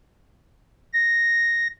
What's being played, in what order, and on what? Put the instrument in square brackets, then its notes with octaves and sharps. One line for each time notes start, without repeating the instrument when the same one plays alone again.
[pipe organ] A#6